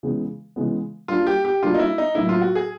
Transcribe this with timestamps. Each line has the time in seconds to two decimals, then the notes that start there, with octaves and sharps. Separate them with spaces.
0.03 C#3 E3 G#3 B3
0.56 C#3 E3 G#3 B3
1.08 G3 A#3 D4 F4 F#4
1.27 G4
1.45 G4
1.62 G3 A#3 D4 F4 F#4
1.74 D#4
1.79 E4
1.98 D#4
2.15 A2 F#3 A#3 E4
2.29 F4
2.41 F#4
2.55 G#4